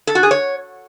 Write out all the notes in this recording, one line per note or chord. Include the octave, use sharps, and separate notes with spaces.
A4
F#4
G#4
C#5